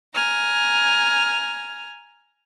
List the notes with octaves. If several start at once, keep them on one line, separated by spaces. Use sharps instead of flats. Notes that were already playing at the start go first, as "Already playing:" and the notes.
G#5 A#5 F6